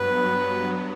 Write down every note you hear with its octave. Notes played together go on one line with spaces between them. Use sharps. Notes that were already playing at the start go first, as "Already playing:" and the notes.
Already playing: G2 F#3 B3 B4